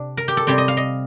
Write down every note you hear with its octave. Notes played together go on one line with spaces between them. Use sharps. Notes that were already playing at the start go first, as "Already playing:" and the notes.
Already playing: C3 C4 D4
A#4
G4
A4
C3 G3 C4 G4
D#5
F5
D#5